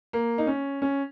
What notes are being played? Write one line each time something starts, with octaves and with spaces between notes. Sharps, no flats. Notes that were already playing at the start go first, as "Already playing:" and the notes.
A#3
D#4
C#4
C#4